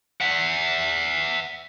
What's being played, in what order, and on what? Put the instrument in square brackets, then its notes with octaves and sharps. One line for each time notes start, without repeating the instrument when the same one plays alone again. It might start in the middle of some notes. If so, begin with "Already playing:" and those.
[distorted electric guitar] E5 F#5